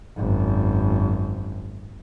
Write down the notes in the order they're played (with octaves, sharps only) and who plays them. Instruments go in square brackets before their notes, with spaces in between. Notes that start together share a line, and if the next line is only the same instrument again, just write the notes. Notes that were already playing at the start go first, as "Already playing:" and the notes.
[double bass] G#1 F#2